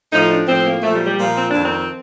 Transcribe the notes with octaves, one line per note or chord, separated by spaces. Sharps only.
A2 F3 D#4
D4
A2 F3 C4
A#3
A#2 F3 A3
G3
G3
A#2 F3
C4
F2 D4
D#3
C4